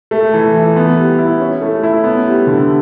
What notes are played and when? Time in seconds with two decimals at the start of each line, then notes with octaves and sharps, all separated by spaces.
0.11 A3
0.34 E3
0.55 E4
0.76 B3
0.97 G3
1.18 E4
1.40 C#4
1.61 A3
1.83 E4
2.04 B3
2.26 G3
2.47 D3